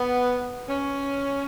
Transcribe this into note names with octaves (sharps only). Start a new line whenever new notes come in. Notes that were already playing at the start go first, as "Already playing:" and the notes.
Already playing: B3
C#4